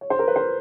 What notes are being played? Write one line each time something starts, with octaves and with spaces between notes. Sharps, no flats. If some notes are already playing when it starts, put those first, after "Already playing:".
C#5
C5
A#4
B4
C5